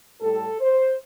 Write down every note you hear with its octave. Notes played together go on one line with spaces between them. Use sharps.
A2 G3 A4
C5